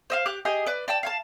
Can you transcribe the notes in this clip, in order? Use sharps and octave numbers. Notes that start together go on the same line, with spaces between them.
C5 D#5 F5
G4 D6 F#6
G4 G#4 D#5
B4 D5
D5 G5 A5
F5 G#5 A5